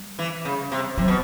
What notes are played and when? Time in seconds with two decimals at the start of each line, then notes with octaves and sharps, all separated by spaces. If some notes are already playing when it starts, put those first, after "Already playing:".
Already playing: G3
0.19 E3
0.45 C#3
0.72 C3
0.98 C3 F#3
1.08 B2